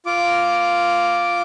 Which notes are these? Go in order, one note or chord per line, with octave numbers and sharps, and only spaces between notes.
F4 D6